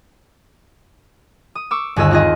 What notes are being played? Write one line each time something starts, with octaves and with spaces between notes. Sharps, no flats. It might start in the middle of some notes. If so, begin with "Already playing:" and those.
D#6
C#6 D6 E6
G1 D#2 G#4 D#5 E6 F#6
C4 D#4 F4 G#4 D#5